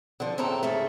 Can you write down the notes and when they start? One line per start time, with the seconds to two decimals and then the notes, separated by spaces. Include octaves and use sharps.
0.20 D3 F3
0.38 E2 A2 C4 A4 C5 A#5
0.63 G#2 C#3 E3 A3